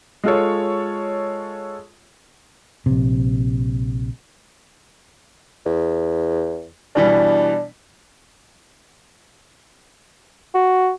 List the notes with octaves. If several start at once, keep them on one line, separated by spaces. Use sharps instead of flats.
G#3 F4 A4 C#5
A#1 C3
E2
B2 E3 G3 D4
F#4